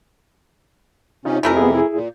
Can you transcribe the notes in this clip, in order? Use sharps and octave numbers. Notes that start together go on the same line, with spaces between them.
C3 C#4 D#4 F4
F2 C3 E3 A3 A#4
B3 G#4
E4 G#4
A#2